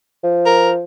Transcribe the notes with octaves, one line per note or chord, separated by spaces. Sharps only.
F3
A#4